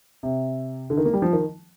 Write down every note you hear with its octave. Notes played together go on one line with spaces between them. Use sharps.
C3
D3
D#3
A#3
G3
F3
D#3